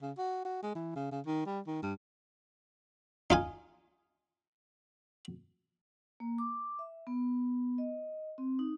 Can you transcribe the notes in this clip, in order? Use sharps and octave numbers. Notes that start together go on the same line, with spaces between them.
C#3
F#4
F#4
G#3
E3
C#3
C#3
D#3
G3
D#3
G2
D#4 F4 G#5
A#3
D6
E5
B3
D#5
C4
D#4